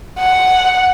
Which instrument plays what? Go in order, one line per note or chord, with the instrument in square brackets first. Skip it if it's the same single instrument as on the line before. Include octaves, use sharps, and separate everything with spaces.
[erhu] F#5